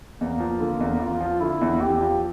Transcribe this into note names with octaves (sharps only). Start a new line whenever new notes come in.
E2 A#3
F3
D3
E2
E2 F4
F3
D3 E4
E2
E2 G4
F3